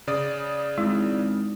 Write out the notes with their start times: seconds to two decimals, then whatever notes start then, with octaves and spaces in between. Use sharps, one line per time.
0.07 C#3 D5 D#6
0.78 G#1 G#3 E4